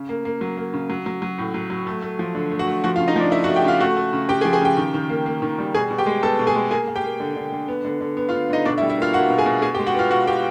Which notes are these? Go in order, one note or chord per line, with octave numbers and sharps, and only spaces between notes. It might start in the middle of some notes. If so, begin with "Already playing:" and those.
Already playing: C#3
A#3
A#3
F#3
A#3
C#3
F#3
F#3
F#3
A2
F#3
F#3
A3
A3
F3
D3
A3
F#4 F#5
A3
F3 F#4 F#5
F4 F5
C#3
D#4 D#5
F3 D4 D5
A3 E4 E5
F#4 F#5
A3
G4 G5
C#3 F4 F5
A3 F#4 F#5
A3
C#3
C#3 G4 G5
G#4 G#5
F3
G#4 G#5
C#3 G4 G5
D#3
D#3
A#3
A#3
D#3
G3
B2 G#4 G#5
B2
G4 G5
G#3
B3 A4 A5
B2
G#4 G#5
G#3
A#3 G#4 G#5
A#3
G4 G5
A#3
D3
D3
D3
B3
D3
D3
B3
F4 F5
D3
D3 D#4 D#5
B2 D4 D5
E4 E5
G3
E4 E5
A#3 F4 F5
A#3 F#4 F#5
B2
G#4 G#5
B2
B2 G#4 G#5
G4 G5
G#3
F#4 F#5
B3 F4 F5
B2 F#4 F#5
B3 G4 G5